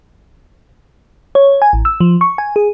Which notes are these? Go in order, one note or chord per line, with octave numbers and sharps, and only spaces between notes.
C#5
G#5
A1
E6
F3
C#6
G#5
G#4